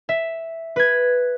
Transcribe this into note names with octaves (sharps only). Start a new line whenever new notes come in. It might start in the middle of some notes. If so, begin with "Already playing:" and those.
E5
B4 G#6